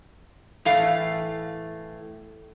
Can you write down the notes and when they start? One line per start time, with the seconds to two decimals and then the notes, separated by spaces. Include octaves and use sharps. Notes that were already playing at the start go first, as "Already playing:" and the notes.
0.65 A2 E3 A3 F5